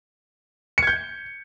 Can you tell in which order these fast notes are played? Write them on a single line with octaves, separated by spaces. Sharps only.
C#7 G#6 G6